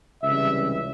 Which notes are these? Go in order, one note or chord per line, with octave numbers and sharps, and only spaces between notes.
C#2 C3 E3 G3 E5